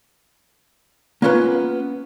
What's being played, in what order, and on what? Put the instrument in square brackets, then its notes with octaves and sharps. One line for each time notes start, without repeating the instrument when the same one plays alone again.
[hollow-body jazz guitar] A#3 B3 C#4 F4 G#4 B4